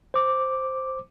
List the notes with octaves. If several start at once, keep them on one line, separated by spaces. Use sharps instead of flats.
C5 D6